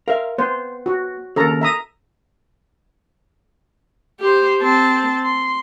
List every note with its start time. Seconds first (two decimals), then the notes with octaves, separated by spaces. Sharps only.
0.08 A#4 E5 F5
0.38 B3 C5
0.86 F#4
1.36 D#2 C#3 A4 A#4 A#5
1.61 E5 A#5 D#6
4.20 G4 C5
4.61 C4 A5
5.24 C6